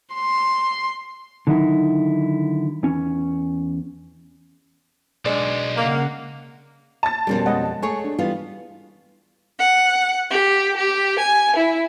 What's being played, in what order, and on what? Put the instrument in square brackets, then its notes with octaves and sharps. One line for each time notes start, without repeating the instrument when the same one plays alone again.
[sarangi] C6
[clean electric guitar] D3 D#3 F#3 D#4 E4
E2 C#4
[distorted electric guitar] B1 [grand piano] G#3 D4 D5
[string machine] C#3 F#5 [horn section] A#3
[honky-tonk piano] A5 A6
[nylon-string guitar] F2 G#2 G3 [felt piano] B2 C#4 A#4
[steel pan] G#3 D#5 F#5
[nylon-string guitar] A3 G#4 C#5 [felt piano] G#5 C#6
[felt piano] D4
[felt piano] E3 [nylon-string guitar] G3 B3 F4
[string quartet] F#5
G4
G4
G#5
E4